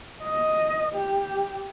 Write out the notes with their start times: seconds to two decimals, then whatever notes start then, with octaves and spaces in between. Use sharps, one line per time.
0.23 D#5
0.95 G4